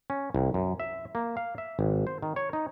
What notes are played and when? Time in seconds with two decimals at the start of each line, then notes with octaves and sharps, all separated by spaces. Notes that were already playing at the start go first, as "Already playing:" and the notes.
0.10 C#4
0.35 C2
0.54 F#2
0.80 E5
1.15 A#3
1.37 F5
1.58 E5
1.79 G#1
2.07 C5
2.22 D#3
2.36 C#5
2.53 D#4